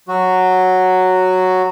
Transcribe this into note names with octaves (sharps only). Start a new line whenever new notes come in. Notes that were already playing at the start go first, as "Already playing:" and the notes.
F#3 F#4